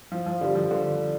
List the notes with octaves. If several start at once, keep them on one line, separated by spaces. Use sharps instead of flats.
F3
F3
D3 G3
F3
D3